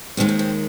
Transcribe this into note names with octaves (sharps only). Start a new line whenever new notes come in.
D#2 D#3 G#3 C4
C4
C4